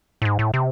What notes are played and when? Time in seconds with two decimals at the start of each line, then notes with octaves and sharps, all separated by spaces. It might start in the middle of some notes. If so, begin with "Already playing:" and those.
0.22 A2
0.25 G#2
0.39 A2
0.54 C3